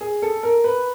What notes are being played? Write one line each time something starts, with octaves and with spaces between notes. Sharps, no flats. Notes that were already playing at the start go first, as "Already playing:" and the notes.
G#4
A4
A#4
B4